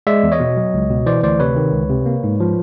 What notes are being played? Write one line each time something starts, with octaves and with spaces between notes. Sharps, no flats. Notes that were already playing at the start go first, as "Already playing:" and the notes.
G#3 D5 E5
E2
C#5 D#5
B2
F#3
C#2
B2
E3 C5 D5
D2 C5 D5
C3 B4 C#5
D#3
C#2
C3
A#3
G#2
F3